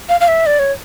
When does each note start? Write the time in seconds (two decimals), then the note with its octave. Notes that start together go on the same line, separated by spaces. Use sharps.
0.09 F5
0.21 F5
0.28 E5
0.46 D5
0.59 C#5